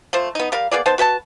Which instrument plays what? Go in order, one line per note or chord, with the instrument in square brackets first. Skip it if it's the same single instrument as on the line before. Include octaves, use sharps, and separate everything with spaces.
[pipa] F3 A3 C5
B3 D#4
G3 A#4 F5
A#3 B3 G#4 D5
B3 D#4 C5 A5
F#4 B4 G5 A5